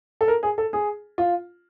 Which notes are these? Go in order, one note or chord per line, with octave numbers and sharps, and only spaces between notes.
A4
A#4
G#4
A4
G#4
F4